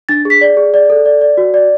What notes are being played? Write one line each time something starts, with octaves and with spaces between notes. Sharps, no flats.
D4 A6
G#4
B6
D5
G#4
D5
A4
D5
D5
F#4
D5